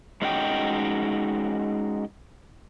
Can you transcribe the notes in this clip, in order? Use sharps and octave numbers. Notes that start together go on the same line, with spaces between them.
G#3 C#4 D#4 F#4 B4 G5